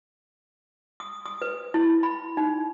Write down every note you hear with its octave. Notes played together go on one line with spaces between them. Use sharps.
D#6
D#6
B4
E4
B5
D#4